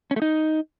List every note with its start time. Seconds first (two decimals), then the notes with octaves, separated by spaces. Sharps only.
0.11 C#4
0.16 A3
0.22 D#4